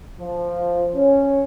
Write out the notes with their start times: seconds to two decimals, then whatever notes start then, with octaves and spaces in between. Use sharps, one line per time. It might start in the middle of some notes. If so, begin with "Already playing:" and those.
0.19 F3
0.95 C#4